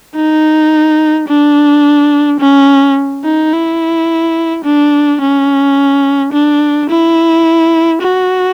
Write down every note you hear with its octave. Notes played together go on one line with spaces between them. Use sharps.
D#4
D4
C#4
D#4
E4
D4
C#4
D4
E4
F#4